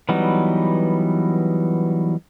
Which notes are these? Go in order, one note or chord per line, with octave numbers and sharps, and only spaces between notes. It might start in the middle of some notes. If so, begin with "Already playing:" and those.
E3 F#3 G3 B3 D#4